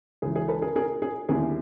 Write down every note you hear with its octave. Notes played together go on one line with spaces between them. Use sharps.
C#2 C#3 E3 G#4
G#4
A4 B4
G#4 A#4
G#4 A#4
G#4
D#2 D3 G3 B3 E4 G#4